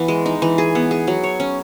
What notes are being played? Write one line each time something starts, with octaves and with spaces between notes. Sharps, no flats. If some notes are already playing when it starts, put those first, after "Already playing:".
Already playing: E3 B3
G#3
D#4
E3
G#4
B3
G#4
F#3
C#5
C#4